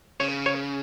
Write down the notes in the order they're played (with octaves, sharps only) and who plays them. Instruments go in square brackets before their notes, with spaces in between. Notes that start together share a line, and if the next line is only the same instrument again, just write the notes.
[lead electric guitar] C#3 [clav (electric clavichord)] C#5
[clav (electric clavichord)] C#5